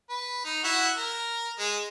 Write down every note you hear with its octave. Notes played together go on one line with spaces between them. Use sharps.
B4
D#4
E4 F#4 F#5
A#4
G#3